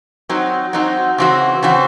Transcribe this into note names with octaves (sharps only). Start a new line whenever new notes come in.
F#3 C4 D#4 F#4
F#3 C4 D#4 F#4
C#3 E3 C4 F#4
C#3 E3 C4 F#4